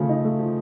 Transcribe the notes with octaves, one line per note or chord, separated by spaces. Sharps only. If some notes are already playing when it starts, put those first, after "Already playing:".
Already playing: C#3 F3 A3
D#4
A3
F3